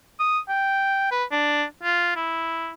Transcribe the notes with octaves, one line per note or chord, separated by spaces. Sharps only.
D#6
G5
B4
D4
F4
E4